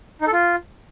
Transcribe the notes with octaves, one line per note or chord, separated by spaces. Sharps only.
D#4
A4
F4